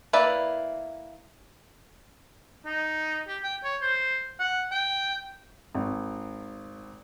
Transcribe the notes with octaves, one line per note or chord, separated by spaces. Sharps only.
A#3 E4 B4 D5 E5
D#4
G4
G5
C#5
C5
F#5
G5
G#1